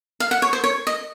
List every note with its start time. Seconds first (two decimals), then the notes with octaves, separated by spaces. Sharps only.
0.20 F5
0.31 F#5
0.42 C#5
0.53 C5
0.64 C#5
0.87 D#5